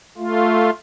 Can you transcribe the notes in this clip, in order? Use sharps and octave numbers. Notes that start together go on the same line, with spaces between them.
A3 F4